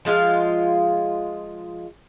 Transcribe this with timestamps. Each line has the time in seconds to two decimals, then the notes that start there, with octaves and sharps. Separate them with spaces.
0.05 F3 G#3 F4 F5